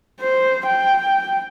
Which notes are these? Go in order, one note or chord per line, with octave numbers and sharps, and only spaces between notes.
C5
G5